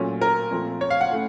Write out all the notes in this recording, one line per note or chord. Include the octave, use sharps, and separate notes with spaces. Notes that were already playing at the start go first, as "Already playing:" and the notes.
Already playing: A#2 F#3 A3 C#4
A#4
A#2 F3 A3 C4
C#5
F5
F#5
A2 A3 C#4